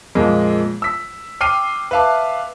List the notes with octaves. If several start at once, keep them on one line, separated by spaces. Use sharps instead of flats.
F2 A#2 G#3 A#3
E6 B6
G5 D6 F6 C7 D#7
B4 E5 F5 A5 D6